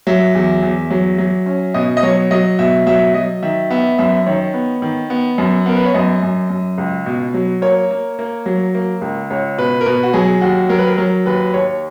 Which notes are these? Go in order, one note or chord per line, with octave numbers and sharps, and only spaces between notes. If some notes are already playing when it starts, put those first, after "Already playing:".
F#3 E5
E2
E2
F#3
F#3
C#4
B2 D#5
D#5
F#3 C#5
F#3 D#5
B2 E5
F#3 E5
F#3 D#5
D#3 E5
B3 E5
F#2 E5
D#3 C#5
B3
D#3
B3
F#2
B3 A#4
B4
C#5
F#2 D#5
F#2
F#2
C#2
B2
F#3
A#3 C#5
A#3
A#3
F#3
A#3
C#2
C#2 C#5
B2 B4
A#4
B2 B4
F#4
F#3 G#4
D#2 F#4
F#3 A#4
B4
A#4
F#3 A#4
D#2 B4
D#2 C#5